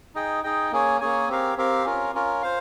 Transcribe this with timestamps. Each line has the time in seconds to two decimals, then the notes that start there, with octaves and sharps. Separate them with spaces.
0.15 D#4 G#4 D#5 G5
0.43 D#4 G#4 D#5 G5
0.72 A#3 C#4 G#4 C#5 G#5
1.01 A#3 C#4 G#4 C#5 G#5
1.28 C4 G4 A#4 F5
1.57 C4 G4 A#4 F5
1.85 C#4 F4 A#4
2.15 C#4 F4 A#4
2.42 C5 F5